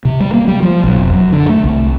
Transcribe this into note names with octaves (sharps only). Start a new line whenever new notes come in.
C3
G3
A#3
G3
F3
B1
F1
F#2
D3
A3
C2